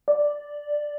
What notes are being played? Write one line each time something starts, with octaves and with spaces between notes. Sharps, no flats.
D5